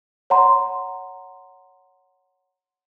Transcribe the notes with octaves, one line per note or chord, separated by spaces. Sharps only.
C#5 F#5 A#5 C6